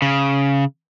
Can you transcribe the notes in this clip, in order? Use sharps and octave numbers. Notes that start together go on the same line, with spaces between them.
C#3